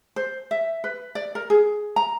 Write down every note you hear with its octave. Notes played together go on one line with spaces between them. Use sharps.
C5
E5
B4
D5
A#4
G#4
A#5